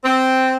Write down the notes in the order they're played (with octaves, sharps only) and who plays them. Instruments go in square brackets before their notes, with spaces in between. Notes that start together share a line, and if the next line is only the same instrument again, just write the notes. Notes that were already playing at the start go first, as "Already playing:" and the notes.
[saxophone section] C4